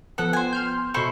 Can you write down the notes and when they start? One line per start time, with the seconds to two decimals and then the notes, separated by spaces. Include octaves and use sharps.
0.18 F3 B3 A4 F#5
0.33 C5 G#5
0.53 C6 F6 G6
0.94 B2 E4 A4 C5 C#6